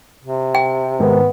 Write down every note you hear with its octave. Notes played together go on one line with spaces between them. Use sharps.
C3
G5
G#2 D#3 B3